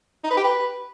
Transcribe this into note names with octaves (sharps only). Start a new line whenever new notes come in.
D#4
B4
G4
B4